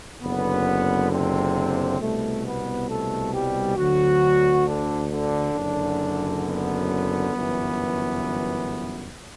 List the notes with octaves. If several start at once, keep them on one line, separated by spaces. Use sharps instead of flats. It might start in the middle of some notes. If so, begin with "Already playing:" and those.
F#1 F#2 D3 B3
C3 C4
C2 B2 A3
B3
A3 A4
G3 G4
D2 D3 F#3 F#4
D3 D4
D3 D4
F#1 F#2 D3
B3
G1 F#2 E3